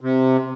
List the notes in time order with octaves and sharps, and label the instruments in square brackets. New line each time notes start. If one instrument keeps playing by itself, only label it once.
[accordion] C3